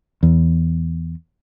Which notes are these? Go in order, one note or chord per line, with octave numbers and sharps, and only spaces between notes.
E2